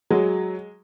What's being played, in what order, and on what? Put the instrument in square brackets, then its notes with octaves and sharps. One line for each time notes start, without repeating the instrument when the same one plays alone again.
[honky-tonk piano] F#3 [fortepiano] G#3